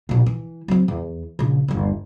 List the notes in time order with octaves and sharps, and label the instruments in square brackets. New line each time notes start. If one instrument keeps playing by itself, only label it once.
[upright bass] A#1 B2
E3
F#3 C4
E2
A#1 C#3
G1 D#2